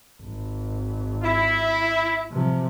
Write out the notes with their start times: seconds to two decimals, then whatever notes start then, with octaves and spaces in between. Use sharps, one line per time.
0.22 G#1
1.24 E4
2.32 C3 F3